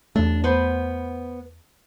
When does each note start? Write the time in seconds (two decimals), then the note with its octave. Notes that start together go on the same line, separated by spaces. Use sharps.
0.16 E2 A3 D4
0.44 B3 B4 C5